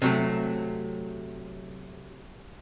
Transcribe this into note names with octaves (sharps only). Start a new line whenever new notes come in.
C3 F#3 A3